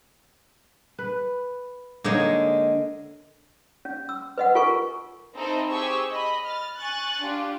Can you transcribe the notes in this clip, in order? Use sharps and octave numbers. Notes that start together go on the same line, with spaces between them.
B4
D3 G#3 A#3 D#4 C#5
C#4
E6
B4 D#5 F#5
F4 A4 A#4 G#5 C#6
C4 D#4 E4 A4 C5 A#5
G4 G#4 C5 G#5 C#6 E6
D#5 B5
F6 A6
G#5 C#6 F#6 A6
D4 F4 G4